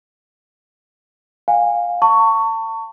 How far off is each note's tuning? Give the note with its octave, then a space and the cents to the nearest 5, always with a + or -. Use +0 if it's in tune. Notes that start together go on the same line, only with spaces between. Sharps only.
F5 +15 G#5 -25
A5 +35 C#6 +10